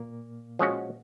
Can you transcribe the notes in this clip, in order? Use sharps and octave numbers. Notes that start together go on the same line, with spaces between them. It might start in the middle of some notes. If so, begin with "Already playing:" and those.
Already playing: A#2 A#3
F3 G#3 C#4 F#4